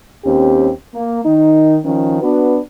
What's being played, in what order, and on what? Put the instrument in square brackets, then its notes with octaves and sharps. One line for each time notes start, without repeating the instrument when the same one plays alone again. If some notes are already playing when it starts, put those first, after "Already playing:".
[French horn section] D#2 C4 C#4 G4
A#3
D#3 D#4
D#3 F3 C#4
B3 D4 F#4 B4